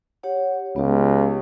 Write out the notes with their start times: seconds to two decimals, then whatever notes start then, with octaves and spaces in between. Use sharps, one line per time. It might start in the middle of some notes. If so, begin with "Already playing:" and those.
0.23 G4 C#5 F#5
0.76 C#2 B3 G4